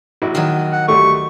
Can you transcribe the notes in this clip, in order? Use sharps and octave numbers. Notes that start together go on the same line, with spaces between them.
A#1 E4 F#4
D#3 F#3
F#5
D2 G3 A3 C#6